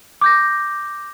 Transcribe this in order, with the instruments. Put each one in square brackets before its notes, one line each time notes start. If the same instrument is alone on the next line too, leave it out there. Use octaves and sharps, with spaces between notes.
[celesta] D6 G6 A#6